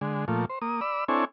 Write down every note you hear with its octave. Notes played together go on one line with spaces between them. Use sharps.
D3 G#3
A#2 F3 A3
C5
A#3 D#6
D5 B5 E6
C4 D4 E4 A4 C#5 G#5